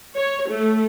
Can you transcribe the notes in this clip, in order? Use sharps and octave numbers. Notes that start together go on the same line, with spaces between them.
C#5
A3